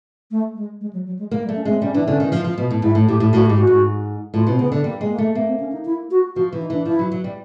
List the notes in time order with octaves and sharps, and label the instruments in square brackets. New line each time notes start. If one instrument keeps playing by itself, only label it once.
[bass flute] A3
G#3
G#3
F#3
F#3
G#3
[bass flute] G#3 [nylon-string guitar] A#3
[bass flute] G3
[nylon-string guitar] A3
[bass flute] C#4
[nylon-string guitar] G#3 [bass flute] C4
[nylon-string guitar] G3 [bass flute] C#4
[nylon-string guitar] E3 [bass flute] D4
[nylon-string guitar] D3 [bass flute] C#4
[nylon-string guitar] D#3
F3
F3
B2
A2
[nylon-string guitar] G#2 [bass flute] E4
[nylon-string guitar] A2
[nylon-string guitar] A2 [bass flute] G4
[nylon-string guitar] A2
[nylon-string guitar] A2 [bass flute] F#4
[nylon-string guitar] G#2 [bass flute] G4
[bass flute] F#4
[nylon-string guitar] G#2
[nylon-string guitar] A2 [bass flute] F4
[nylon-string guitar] B2 [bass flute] C4
[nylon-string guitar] C#3 [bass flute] B3
[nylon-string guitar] D3
[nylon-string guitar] G3 [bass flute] A#3
[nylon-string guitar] G#3
[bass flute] A#3
[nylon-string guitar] A3
[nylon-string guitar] A#3 [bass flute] B3
[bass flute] C4
C#4
D#4
E4
F#4
[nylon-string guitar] F3 [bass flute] F#4
[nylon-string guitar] E3
[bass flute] D#4
[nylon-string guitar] E3 [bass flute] D4
[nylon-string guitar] F3 [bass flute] E4
[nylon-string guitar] F#3
F#3
G3